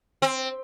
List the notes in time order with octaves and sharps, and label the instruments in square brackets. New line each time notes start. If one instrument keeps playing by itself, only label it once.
[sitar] C4